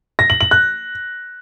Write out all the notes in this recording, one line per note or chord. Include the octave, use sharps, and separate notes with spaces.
A#6
F#7
F#7
F#6